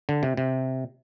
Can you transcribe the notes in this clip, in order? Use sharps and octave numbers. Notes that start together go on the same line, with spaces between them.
D3
C3
C3